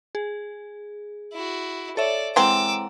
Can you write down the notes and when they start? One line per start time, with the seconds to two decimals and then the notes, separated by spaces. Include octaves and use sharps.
0.15 G#4
1.33 E4 F#4
1.97 A4 C#5 D5 E5
2.36 E3 G#3 C4 F#5 A#5 D6 E6